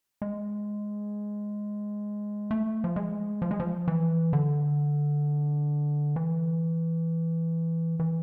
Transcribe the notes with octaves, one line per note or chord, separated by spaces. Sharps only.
G#3
A3
F3
G#3
F3
G#3
F3
E3
D3
E3
E3